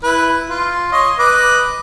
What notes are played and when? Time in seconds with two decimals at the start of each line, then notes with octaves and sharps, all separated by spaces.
0.03 E4 B4
0.49 F4
0.92 C#5 D#5 C6
1.19 B4 D#5 D6